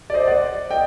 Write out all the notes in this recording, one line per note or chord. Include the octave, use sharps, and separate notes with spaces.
D5
C5 D#5
D5 F#5
D#5 G5